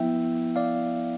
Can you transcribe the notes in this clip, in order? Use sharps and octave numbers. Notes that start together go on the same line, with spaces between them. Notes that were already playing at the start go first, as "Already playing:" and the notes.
Already playing: F3 B3 E4 E5 G5
D5 F5